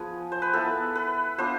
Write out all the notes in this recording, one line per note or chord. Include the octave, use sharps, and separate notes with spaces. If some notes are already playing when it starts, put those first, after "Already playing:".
Already playing: F3 B3 F4 G#4
C5
B4
B3 E4 A4
B4
B3 D4 F4 C5